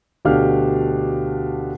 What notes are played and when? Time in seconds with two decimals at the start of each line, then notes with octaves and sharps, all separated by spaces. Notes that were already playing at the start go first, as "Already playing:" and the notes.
0.25 D2 B2 D4 G4 F5 F6